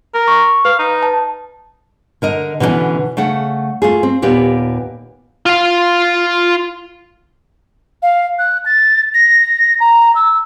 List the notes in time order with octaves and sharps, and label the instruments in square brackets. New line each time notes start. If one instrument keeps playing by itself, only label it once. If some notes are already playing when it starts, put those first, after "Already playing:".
[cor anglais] A#4
[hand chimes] C#6
[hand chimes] B4 [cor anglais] F5
[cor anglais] D#4
[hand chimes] A5
[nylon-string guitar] D3 A#4 D#5
B2 D3 E3 G3 B3 C#4
C#3 A3 F#5
A3 F4 G#4
C4
D#2 A#2 B3 G4
[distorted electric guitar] F4 F5
[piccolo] F5
F#6
A6
A#6
A#5
E6